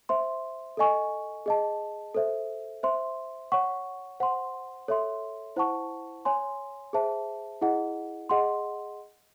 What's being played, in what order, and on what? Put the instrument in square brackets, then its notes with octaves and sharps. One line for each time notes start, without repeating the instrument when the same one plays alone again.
[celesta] C5 E5 C6
A4 D#5 G#5 C#6
G#4 D#5 A5
A4 C5 E5
C5 E5 C6
C#5 F#5 C#6
C5 F#5 C6
A4 C#5 E5 C6
E4 C5 F#5 A5 C#6
C#5 G#5 C6
G#4 C5 E5 A5
E4 G#4 D#5 F#5
G#4 D#5 F#5 C6